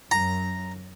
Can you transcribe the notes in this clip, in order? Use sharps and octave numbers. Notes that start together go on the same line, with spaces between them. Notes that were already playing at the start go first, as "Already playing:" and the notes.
F#2 A#5